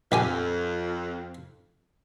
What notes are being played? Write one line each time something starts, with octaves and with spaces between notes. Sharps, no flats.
A#1 F2 G4 G#5